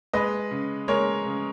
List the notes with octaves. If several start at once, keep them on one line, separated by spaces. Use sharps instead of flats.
G#3 B4 D#5
C#3
G#3 A#4 C#5
C#3